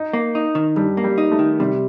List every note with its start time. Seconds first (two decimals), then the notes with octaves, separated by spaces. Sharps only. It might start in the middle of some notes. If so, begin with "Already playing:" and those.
Already playing: D#4
0.13 A#3
0.35 D#4
0.55 D#3
0.76 G2 G3
0.97 A#3
1.04 G3
1.18 D#4
1.31 A3
1.39 D#3
1.60 C3 G3